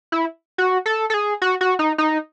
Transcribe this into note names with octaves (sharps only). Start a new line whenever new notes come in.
E4
F#4
A4
A4
G#4
F#4
F#4
D#4
D#4